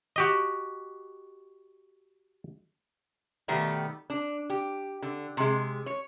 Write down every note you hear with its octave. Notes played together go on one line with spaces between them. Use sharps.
F#4 G4 D#5
B2 D#3 G3 A3 B3
D4
G4
D3
C3 G#3
C#5